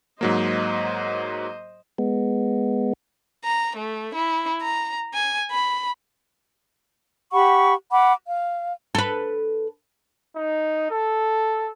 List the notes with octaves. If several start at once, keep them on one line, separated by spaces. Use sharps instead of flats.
G#2 F#3 A#3 C5 D#5
G#3 B3
A#5
A3
E4
A#5
G#5
B5
G4 F#5 B5 C#6
F#5 B5 D6
F5
A4 B4
D#4
A4